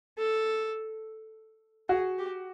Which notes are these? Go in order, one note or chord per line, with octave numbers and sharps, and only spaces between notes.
A4
F#4 G#4
G4